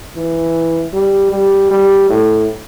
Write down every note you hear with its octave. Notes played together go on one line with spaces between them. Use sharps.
E3
G3
G3
G3
A2